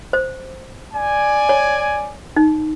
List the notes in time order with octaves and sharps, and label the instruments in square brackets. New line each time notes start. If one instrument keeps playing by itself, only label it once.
[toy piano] C5
[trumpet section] D5 G#5
[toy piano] C#5
D#4